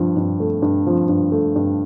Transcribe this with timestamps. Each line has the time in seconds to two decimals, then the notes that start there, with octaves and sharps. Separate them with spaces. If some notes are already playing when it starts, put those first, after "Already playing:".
Already playing: G2 F3
0.17 G2
0.40 A3
0.62 G2
0.86 F3
1.09 G2
1.32 A3
1.56 G2